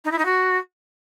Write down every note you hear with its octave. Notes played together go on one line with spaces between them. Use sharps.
D#4
E4
D#4
F#4